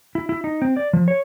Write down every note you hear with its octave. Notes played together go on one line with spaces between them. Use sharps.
E4
E4
D#4
C4
D5
F3
C#5